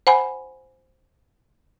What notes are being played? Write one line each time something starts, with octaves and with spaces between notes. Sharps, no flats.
C5 F#5 G#5 B5